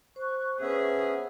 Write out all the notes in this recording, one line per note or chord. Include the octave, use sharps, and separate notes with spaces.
C5 C#6 F#6
B3 C#4 D4 G#4 E5